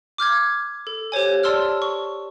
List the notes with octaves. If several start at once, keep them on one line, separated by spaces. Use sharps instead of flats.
D6 F6 G6 G#6
A4
G4 C5 C#5 G#5
D5 A5 C6 E6 F6
C#6